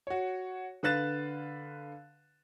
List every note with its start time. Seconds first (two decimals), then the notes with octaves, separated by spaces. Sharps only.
0.07 F#4 C#5
0.83 D3 B4 F5 F#6 A6 E7